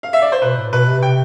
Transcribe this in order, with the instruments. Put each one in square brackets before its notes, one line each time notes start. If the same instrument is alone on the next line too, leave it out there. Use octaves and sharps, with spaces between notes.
[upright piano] F5
E5
D5
C5
[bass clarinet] B2 [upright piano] B4
[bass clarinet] A2
[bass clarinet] B2 [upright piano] B4
[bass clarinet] C3
[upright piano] G5